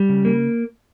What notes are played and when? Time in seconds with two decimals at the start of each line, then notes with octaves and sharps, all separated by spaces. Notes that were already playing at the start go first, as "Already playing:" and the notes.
Already playing: G3
0.09 C#3
0.25 A#3